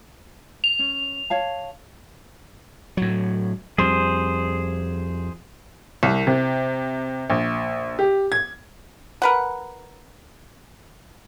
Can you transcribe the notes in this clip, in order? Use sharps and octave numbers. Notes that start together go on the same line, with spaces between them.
F7
C#4
C#5 F5 A5
A2 F#3
F2 G3 G#4 C5
C2
C3
A#1
G4
G#6
A#4 B4 F#5